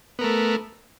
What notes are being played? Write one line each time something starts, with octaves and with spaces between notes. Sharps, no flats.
A3 B3 A#4